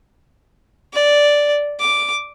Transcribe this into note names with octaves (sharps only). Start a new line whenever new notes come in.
D5
D6